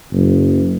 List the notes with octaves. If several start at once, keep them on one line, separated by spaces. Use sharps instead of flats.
F#1